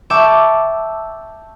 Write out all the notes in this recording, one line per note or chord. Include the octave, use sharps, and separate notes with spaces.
E5 G5 A5 C#6 D6 E6